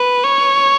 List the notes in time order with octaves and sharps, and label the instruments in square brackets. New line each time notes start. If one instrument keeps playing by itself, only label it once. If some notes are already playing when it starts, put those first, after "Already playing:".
Already playing: [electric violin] B4
C#5